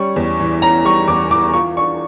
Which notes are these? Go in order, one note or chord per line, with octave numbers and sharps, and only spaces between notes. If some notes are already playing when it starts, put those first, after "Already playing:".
Already playing: G3 C#4 C#6
E2
E3
C#4 A#5
G3 C#6
E2 D6
E3 D6
F4 C#6
D4 C#6